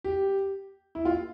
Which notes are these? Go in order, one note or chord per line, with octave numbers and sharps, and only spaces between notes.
G4
E4
F4